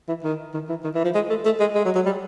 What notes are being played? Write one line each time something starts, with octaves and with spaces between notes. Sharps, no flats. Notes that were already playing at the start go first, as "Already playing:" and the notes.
E3
D#3
D#3
E3
D#3
E3
F3
G#3
A3
A3
G#3
G#3
F#3
F#3
G3